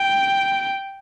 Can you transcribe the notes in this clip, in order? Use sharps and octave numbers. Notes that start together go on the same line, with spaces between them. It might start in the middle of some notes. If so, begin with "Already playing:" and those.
Already playing: G5